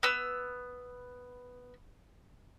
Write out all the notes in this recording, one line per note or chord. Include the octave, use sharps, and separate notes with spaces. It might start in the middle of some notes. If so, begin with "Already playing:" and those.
B3 E6